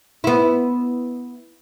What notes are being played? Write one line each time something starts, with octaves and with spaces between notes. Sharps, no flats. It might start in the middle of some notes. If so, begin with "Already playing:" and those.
B3 E4